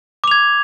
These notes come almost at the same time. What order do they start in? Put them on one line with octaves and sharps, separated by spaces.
D6 F7 G#6